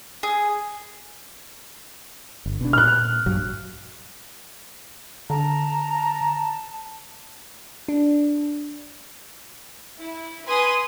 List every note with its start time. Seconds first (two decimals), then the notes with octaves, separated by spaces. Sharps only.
0.23 G#4
2.46 G1
2.61 B2 D4
2.73 A#2 F6 F#6
3.26 A#1 G2 F#3
5.30 D3 A5 A#5
7.88 D4
9.98 E4
10.47 B4 G#5 B5 C6 D#6